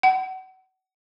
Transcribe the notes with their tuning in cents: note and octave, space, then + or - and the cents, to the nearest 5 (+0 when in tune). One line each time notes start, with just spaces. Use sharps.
F#5 +30